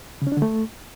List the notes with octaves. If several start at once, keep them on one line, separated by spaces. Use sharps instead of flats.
C#3
C#4
D4
D3
A3